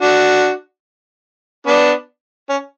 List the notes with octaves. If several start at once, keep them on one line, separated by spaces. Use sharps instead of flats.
D4 F#4
B3 D4
C#4